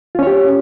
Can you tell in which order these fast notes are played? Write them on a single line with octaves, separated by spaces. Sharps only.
F4 C#4 C#5 G4